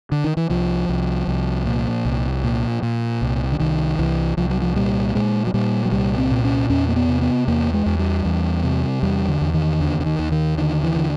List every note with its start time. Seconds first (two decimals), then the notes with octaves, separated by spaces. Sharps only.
0.12 D3
0.24 D#3
0.37 E3
0.50 C2 F3
0.89 C2
1.28 C2
1.66 A#2
2.05 C2
2.44 A#2
2.83 A#2
3.22 C2
3.52 D3
3.60 C2 D#3
3.99 C2 E3
4.37 C2 F3
4.50 F#3
4.62 F3
4.76 A#2 G3
5.15 A#2 G#3
5.47 F#3
5.54 A#2 G3
5.85 F#3
5.92 C2 G3
6.18 C4
6.31 A#2
6.44 C#4
6.70 E2 C#4
6.89 A#3
6.96 B3
7.09 C3
7.22 B3
7.48 E2 A#3
7.73 G#3
7.86 E2
7.99 G3
8.25 E2
8.64 C3
9.03 E2 G3
9.28 D3
9.41 E2
9.54 D#3
9.80 D#2 D3
10.00 D3
10.06 D#3
10.19 D#2
10.32 D#3
10.58 D3 D#3
10.84 E3
10.96 D3